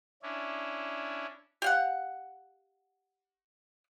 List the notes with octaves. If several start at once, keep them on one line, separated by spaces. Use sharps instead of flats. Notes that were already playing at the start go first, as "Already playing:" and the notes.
C#4 D4 E4
G4 F5 F#5